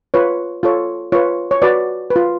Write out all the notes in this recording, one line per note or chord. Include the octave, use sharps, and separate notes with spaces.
F4 B4 C#5
F4 A4 C#5
F4 B4 C#5
C#5
F#4 B4 D5
B4
F4